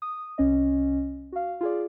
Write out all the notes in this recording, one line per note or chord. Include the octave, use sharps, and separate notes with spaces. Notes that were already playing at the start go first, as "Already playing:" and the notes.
D#6
C2 C#4 D#5
F#4 F5
F4 G#4 D5